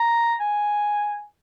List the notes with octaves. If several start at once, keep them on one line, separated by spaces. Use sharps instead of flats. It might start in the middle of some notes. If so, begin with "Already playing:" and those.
Already playing: A#5
G#5